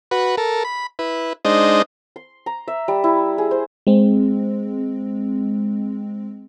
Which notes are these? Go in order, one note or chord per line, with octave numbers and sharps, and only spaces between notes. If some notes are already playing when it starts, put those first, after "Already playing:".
F#4 B4
A4 A#4
B5
E4 B4
G#3 D4 D#4 C5 D#5
C6
A#5
E5
G3
E4
G#4
C5
G#3 C4